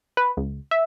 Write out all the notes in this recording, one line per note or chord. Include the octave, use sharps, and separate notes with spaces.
B4
C#2
E5